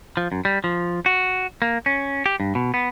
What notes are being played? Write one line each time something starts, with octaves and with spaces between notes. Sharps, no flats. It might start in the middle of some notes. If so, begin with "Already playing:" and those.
F3
F#2
G3
F3
F#4
A#3
C#4
G4
G2
B2
B3